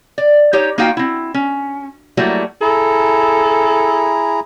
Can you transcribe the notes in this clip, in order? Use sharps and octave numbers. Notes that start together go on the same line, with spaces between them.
D5
D#4 G4 C#5
A#3 D#4 F4 F#4 F5 G5
C4 E4
C#4
F#3 G3 A3 A#3 E4 F#4
E4 G#4 A4 A#5